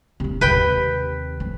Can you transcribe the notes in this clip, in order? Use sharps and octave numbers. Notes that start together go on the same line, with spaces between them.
E1 C3
D#2 C3 B4 G5
F2